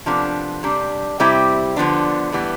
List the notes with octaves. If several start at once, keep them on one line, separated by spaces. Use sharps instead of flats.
C3 F3 B3 D4 A4
C3 G3 D4
C3 G3 C4 E4 G4
D3 F3 B3 D4
A2 E3 G3 B3